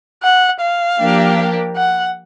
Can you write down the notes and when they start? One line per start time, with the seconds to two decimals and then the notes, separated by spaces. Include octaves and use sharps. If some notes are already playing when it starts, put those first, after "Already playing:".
0.23 F#5
0.61 F5
0.99 F3 A#3 D4 G4 A#4
1.77 F#5